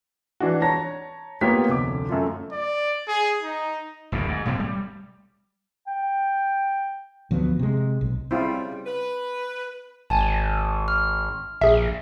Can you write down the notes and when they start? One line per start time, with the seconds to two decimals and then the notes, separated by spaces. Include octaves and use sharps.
0.40 E3 D4 F#4
0.62 C#5 A5 A#5 A#6
1.41 A#3 B3 F4 G4 C#5 B6
1.69 F1 D2 D6
2.09 F#2 A3 F4
2.52 D5
3.08 G#4
3.43 D#4
4.12 F#1 D2 G2 B2
4.28 G#2
4.45 B1 A2 C3 C4
4.60 G3
5.87 G5
7.31 D2 F3 F#3 B3
7.59 C3 G#3
8.01 B1
8.31 C#3 G3 C4 E4 F4
8.86 B4
10.10 G#1 G#5 A5
10.88 F6
11.61 A#1 G#4 E5